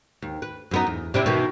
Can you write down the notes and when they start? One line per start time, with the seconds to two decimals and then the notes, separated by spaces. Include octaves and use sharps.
0.22 D#2
0.42 B4
0.71 F#2 B3 D#4
0.87 E2
1.14 C3 D4 E4
1.26 B2 D#3 E3